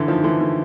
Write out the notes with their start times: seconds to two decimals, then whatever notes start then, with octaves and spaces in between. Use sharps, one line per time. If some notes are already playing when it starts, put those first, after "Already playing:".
Already playing: D3 E3
0.08 D#3 F3
0.24 D3 E3
0.40 D3